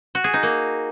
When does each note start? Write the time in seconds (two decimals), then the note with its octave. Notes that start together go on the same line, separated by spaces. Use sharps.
0.15 F#4
0.24 G#4
0.34 D#4
0.43 A#3